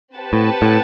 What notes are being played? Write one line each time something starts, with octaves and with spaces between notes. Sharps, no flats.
C4 G4 B4 F#5 A5
A2
A2